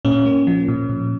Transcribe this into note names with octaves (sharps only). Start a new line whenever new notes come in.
A#2 C#4
A#3
F3
A#2
A#2